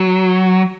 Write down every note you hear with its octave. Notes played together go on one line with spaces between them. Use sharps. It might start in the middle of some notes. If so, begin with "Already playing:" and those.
Already playing: F#3